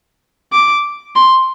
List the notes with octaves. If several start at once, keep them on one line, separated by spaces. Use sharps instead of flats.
D6
C6